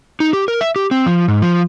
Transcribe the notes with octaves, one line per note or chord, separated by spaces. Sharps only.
D#4
G4
A#4
E5
G4
C4
F3
G#2
F3